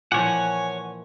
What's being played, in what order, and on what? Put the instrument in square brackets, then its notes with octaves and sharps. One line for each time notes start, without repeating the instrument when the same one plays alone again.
[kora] A#2 E3 F3 [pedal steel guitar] C#5 F#5 [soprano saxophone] G#5